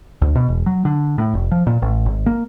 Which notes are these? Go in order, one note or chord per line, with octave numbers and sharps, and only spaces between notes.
D2
B2
E1
F#3
D3
A2
F1
F3
A#2
A1
G#1
A#3